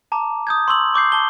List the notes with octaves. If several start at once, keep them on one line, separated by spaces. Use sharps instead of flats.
A5 A#5 D6
D#6 G6 G#6
C6 C#6 E6 F#7
C#6 D6 G6 C7
A5 G7